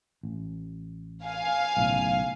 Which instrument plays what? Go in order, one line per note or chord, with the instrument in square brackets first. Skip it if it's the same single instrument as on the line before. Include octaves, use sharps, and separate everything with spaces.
[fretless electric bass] A1
[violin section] F5 G#5
[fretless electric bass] B1 A2 C#3